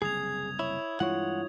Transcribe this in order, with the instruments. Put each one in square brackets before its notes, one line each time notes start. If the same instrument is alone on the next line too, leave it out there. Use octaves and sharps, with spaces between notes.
[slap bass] F#1 C2 [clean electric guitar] G#4 [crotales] D#6 G#6 F7
[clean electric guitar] E4 [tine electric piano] C#5
[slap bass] G2 E3 G#3 [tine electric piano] E4 F4 C#5 [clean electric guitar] F#5